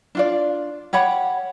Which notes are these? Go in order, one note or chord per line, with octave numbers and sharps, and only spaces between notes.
D4 F4 D5
G4 C#5 F#5 B5